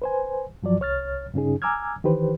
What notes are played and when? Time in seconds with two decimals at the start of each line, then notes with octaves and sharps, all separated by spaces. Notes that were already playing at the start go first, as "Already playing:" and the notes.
0.02 B4 C5 G#5
0.62 G2 F3 F#3 D5
0.80 C2 C#5 F6 A6
1.34 G2 C#3 C#4 D#4 G#4
1.62 G#5 A#5 D6 E6 F6 G#6
2.04 D#3 E3 G4 B4 C5